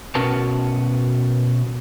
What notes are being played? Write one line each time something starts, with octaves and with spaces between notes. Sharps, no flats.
B2 C#4 F#4 A#4 B4 A5